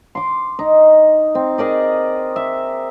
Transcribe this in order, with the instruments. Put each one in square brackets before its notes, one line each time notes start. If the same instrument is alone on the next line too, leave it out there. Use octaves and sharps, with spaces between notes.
[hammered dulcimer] C6 D6
D#4
C4
G#4 A#4 D5 D#5
E5